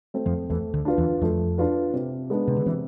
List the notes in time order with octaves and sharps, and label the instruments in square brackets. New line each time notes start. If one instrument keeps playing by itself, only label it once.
[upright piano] A3 C4
[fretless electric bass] F2 F3
[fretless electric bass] E2 E3 [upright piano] A3
[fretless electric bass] D2 D3
[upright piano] D4 F4 B4
[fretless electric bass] E2 E3
[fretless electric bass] F2 F3 [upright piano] A3
[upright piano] D4 F4 B4
C3
G#3 B3 D4
[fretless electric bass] C3
D3
[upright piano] C3 [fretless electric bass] E3